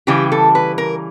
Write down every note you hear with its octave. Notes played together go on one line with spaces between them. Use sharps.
C#3 E3 G3 G4
A4
B4
A#4